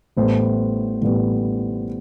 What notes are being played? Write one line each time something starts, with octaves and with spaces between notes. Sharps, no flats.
A1 A2 G3 B3 C5
A1 A2 G3 B3